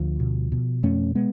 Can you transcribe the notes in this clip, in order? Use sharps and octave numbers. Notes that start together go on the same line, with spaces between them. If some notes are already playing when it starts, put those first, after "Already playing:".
Already playing: D2 F3
B2
B2
F2 A3 C#4
G#3 B3